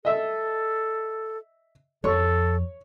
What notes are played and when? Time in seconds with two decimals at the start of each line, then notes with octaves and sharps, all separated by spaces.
0.05 A4 D#5 E5 E6
2.04 F2 A4 C#5 C#6